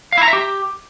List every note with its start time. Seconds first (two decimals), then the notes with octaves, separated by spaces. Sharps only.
0.12 F5
0.18 E4
0.23 A#5
0.28 E5
0.33 G4